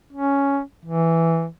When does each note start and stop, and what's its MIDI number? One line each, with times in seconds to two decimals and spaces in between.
0.13 0.60 61
0.85 1.46 52